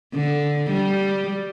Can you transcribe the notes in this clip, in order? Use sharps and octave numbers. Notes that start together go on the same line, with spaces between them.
D3
G3